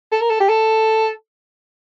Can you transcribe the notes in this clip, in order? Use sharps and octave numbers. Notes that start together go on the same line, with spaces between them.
A4
A#4
A4
G4
A4